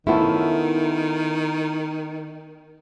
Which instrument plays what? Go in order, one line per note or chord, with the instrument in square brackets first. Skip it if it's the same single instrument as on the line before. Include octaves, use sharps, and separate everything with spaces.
[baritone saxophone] D#3 [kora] A3 B3 C#4 [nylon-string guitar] E4 F4 A4